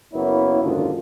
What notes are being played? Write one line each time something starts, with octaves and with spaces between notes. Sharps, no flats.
F#1 A#3 B3 E4 C#5
F#1 D#2 G#2 D3 D4 F4